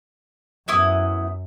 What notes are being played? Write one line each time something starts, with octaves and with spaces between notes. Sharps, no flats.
F#2 B3 E4 D#6